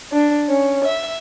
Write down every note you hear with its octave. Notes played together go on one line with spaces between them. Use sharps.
D4
C#4
E5